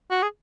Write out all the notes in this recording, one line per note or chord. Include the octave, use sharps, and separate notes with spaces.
F#4
G#4